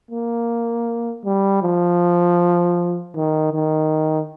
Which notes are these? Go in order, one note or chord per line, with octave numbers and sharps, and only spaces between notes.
A#3
G3
F3
D#3
D#3